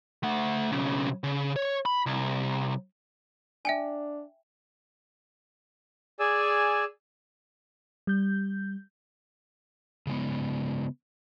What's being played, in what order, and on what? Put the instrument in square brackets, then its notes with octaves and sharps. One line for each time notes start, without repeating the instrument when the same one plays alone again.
[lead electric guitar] A3 F#5
B1 C#3
C#3
C#5
B5
C2
[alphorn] D4 [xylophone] E5 G5 G#5
[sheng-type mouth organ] G#4 D5 G#5 E6
[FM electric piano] G3 G6
[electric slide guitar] C#3 G#3 B3